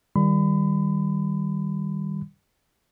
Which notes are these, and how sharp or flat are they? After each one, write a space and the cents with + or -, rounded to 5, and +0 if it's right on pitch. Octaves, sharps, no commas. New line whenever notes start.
D#3 +0 G3 +0 B5 +35